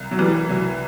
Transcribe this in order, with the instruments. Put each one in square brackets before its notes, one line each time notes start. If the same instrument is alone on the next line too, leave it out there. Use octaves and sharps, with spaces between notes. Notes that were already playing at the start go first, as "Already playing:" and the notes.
Already playing: [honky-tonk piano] C2
[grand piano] F#3
[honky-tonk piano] E3 [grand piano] G3
[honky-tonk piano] C2 [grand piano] F#3